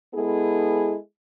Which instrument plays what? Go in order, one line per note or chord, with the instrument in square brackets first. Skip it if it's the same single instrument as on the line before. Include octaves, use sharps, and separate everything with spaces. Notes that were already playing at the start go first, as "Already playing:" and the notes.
[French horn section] G#3 B3 E4 G#4 A4